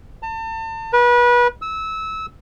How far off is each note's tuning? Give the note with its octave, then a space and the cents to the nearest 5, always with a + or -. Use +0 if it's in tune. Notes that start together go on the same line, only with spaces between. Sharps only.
A5 +35
B4 -30
E6 -20